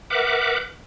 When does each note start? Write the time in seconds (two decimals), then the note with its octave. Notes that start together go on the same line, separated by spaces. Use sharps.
0.10 A#4 B4 E5 F#5 D6